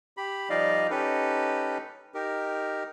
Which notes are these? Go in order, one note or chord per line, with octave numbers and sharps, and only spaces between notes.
G4 B5
F3 G3 D#4 D5 D#5 F5
C#4 D#4 G4 A4 B4
D#4 G4 A#4